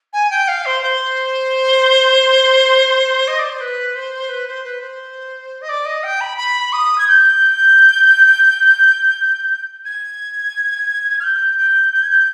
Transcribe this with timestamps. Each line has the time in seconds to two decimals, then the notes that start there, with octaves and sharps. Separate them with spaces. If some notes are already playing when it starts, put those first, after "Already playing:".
0.13 G#5
0.31 G5
0.48 F5
0.66 C5
0.82 C5
3.28 D#5
3.38 D5
3.49 C5
3.60 B4
3.95 C5
4.29 B4
4.47 C5
4.64 B4
4.82 C5
5.61 D#5
5.69 D5
5.85 D#5
6.03 G5
6.21 B5
6.37 B5
6.73 D#6
6.98 G#6
7.07 G6
9.85 G#6
11.20 F6
11.24 G6
11.58 G6
11.93 G6
12.02 G#6
12.10 G6